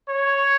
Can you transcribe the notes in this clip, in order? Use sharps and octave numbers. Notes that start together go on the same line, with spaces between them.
C#5